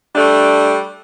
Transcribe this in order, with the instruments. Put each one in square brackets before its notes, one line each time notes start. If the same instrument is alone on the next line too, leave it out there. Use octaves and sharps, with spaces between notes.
[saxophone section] G3 A3 D4